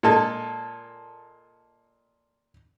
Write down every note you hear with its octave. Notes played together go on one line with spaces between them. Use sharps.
A#2 G#3 A4